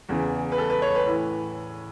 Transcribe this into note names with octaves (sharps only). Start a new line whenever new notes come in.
E2 C#3 E3
B4
A4
B4
C#5
B4
A2 E3